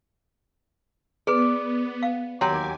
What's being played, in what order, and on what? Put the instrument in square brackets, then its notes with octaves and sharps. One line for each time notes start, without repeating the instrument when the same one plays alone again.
[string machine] B3 [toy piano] G#4 B4 [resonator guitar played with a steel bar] D5
[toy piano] F5
[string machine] D#2 G#5 D6 [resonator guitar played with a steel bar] F#3 G4 [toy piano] C#5 G5 C6